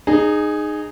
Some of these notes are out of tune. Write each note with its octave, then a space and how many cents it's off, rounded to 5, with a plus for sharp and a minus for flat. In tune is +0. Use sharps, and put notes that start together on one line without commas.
D#4 -25 G#4 +0